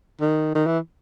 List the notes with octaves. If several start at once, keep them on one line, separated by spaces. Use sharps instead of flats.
D#3
D#3
E3